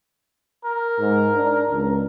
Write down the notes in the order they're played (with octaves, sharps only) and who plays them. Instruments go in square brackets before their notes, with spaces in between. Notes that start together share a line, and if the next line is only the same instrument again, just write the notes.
[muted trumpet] A#4
[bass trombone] G#2
D4
C#2